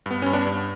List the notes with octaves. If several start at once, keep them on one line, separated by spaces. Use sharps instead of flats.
G2 B3
G2 C#4
B3 D4
G2